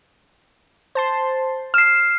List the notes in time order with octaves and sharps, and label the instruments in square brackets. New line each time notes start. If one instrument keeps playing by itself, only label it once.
[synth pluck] C5 A5 C6
[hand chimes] F6 C7 [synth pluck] E7